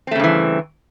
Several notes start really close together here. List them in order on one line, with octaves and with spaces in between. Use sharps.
C4 A3 C#3 G2 E3